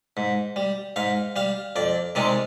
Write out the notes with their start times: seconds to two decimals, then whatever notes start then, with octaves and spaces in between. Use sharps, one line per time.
0.17 G#2
0.56 G3
0.96 G#2 F5
1.36 G3 F5
1.76 F2 D5
2.15 C3 D#3 G#3 D5